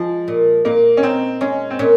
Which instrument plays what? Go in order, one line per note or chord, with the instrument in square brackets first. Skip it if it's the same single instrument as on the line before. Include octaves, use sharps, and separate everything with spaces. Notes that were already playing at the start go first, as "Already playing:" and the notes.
Already playing: [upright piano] F3 [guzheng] G#3
[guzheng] A#2
[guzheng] A#2 [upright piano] A#3
[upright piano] C#4
[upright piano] C4 [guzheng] D#4
[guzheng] G#3 [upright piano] C#4
[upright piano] C4
[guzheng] A#2 [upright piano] C#4